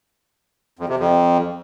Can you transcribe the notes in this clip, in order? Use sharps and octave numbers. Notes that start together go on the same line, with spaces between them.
F2
C3
F2